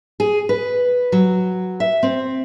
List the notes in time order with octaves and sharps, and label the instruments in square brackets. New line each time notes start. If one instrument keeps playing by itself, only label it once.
[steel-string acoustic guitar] G#4
B4
F#3
E5
C4